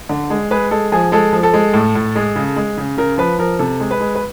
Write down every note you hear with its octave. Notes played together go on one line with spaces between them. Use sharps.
D3
G#3
G#3 B4
G#3 A4
F3 G#4
G#3 A4
F3
A4
G#3
A2
A2
G#3
C#3
G#3
C#3
C#3 A#4
F3 B4
F3 A#4
C3 A4
G#3
B4
G#3
B4